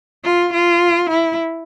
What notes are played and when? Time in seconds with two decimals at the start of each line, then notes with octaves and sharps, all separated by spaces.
0.24 F4
0.54 F4
1.10 E4